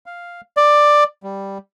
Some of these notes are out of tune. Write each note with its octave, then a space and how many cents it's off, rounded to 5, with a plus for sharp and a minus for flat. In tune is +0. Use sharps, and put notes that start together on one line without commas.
F5 +0
D5 +10
G3 +0